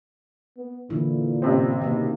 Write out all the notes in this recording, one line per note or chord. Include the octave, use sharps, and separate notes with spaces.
B3
A#2 D3 E3 E4
A1 C3 C4
B2 D#3 A#3